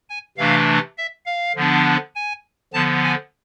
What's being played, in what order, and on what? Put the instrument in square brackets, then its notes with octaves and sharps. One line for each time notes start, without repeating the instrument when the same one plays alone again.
[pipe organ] G#5
C3 E3 A3 D4 F5
E5
F5
D3 F3 B3 D4
G#5
D3 F3 B3 A5
G#5